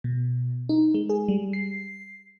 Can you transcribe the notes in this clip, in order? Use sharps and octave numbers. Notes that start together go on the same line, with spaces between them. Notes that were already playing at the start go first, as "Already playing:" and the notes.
B2
D#4
G#3
G#4
G3
C7